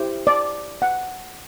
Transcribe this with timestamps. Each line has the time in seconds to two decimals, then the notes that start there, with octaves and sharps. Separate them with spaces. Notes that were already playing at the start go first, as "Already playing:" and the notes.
Already playing: E4 G4 C5
0.27 D5
0.82 F#5